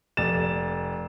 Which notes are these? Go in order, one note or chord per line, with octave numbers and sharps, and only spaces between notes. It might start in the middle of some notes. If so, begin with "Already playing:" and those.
F1 D5 A6 E7